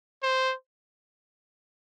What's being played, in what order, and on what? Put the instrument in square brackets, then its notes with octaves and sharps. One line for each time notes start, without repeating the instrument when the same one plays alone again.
[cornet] C5